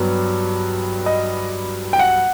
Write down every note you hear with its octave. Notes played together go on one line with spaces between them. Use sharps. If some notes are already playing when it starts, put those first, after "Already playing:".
Already playing: G2 F#3 B3 B4
D#5
G5
F#5